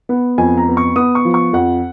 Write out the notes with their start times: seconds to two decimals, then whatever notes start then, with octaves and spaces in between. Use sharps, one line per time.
0.09 B3
0.38 F2 G#5
0.58 A#5
0.68 B3
0.77 C#6
0.96 B3 D#6
1.15 C#6
1.25 F3
1.34 C#6
1.53 F2 F#5